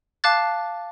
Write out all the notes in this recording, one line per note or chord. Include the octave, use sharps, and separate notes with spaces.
F5 A5 D6 F#6 A6